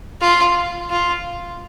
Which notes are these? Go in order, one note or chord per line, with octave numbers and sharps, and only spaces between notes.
F4
F4